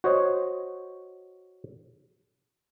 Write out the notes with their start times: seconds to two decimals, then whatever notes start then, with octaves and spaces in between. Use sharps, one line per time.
0.04 F#4 C5 C#5 D#5